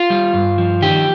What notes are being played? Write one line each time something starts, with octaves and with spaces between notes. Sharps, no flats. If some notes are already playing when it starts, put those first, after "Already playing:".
Already playing: F4
G3
G2
F3
D#3 G4